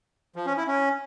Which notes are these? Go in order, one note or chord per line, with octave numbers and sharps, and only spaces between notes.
F3
C#4
E4
C#4